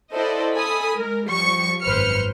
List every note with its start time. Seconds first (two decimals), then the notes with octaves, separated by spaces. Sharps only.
0.12 E4 A4 C5 D5 D#5 F#5
0.55 A4 G#5 B5 D#6
0.95 G#3 A#4
1.29 F3 G3 C#6 C#7
1.82 G#1 F#2 B4 C5 F6 C#7